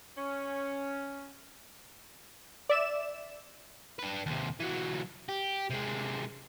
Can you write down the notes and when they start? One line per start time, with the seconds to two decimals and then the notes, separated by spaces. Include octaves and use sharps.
0.18 C#4
2.69 D5 E5 E7
3.99 D4 B4
4.26 D#2 C3
4.60 E3 F#3
5.29 G4
5.70 C3 G#3